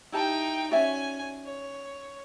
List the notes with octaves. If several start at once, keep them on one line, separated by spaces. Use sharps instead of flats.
D#4 E4 G4 G5 A5
C#4 F#4 D5 E5 G#5
C#5